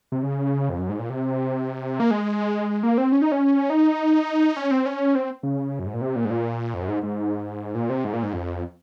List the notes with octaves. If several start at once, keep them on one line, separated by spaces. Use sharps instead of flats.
C3
C#3
F2
F#2
G#2
A#2
C3
A#3
G#3
A#3
C4
C#4
D#4
C#4
D#4
C#4
C4
C#4
C4
C#3
F#2
G#2
A#2
C3
A#2
G#2
A#2
F2
F#2
G#2
G#2
A#2
C3
G#2
A#2
G#2
F2